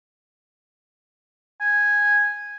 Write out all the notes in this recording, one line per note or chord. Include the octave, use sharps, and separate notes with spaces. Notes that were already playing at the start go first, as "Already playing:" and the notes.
G#5